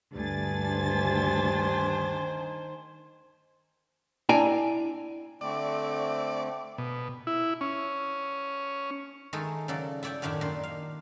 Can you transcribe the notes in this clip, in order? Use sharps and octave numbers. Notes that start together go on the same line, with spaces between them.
D2 G2 D4 G#5 A6
D#3 C5
D4 E4 D5 G5 G#5 A#5
D3 A3 C4 D5
B2
E4
C#4
D#3 G#3 A3 D#4 G#4 A4
C#3 F#3 A4 D5
E4 A4 D5 E5 G5
F#2 A2 D#3 D4 E4 G4
A#2 D#3 D4 C6
F5